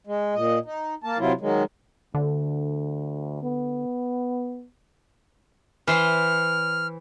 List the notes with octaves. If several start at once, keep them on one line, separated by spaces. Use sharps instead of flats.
G#3
A#2 D#5
D#4
A#3 A5
C3 F#3 E4 F4
D#3 F#3 G#3
D2 D3
B3
E3 C5 C6 F6